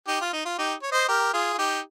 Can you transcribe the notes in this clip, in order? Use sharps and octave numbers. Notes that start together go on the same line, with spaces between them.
D#4 G4
F4
D#4
F4
D#4 G4
C#5
C5 D#5
G4 A#4
F4 G#4
F4
D#4 G4